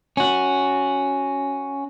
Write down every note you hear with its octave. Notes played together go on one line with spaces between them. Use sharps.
C#4 F#4